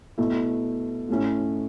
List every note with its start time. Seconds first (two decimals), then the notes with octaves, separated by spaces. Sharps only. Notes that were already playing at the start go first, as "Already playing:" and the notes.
0.18 B2 A3 E4
1.08 A2 A3 C#4 E4